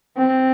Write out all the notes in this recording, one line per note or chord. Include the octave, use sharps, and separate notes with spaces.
C4